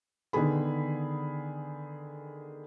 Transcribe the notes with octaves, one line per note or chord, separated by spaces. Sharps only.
D3 D#3 B3 G#4 B5